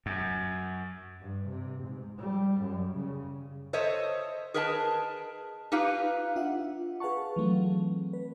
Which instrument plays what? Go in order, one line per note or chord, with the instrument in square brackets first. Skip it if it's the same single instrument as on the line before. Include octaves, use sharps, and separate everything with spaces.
[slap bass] F#2
[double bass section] G2
C3
G#2
G3
F#2
C#3
[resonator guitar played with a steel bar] A4 C5 C#5 D#5 E5
G#4 A#4 B4 D#5 G#5 A5
D#4 F4 G4 B4 F5
[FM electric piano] D4 F4 E5 F#5
G#4 B4 F5 F#5 A5 C#6
E3 F#3 A3 C4
B4